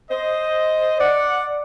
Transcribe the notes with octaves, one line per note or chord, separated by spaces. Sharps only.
C5 D#5
D5 F#5